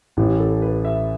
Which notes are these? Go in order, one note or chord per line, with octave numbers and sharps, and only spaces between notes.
A1 A2 E3 G4
A4
B4
E5